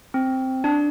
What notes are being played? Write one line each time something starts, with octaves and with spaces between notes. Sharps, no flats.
C4
D4